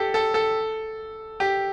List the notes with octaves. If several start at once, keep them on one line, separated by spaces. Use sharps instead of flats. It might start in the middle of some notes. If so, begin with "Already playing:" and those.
Already playing: G4 A4
A4
A4
G4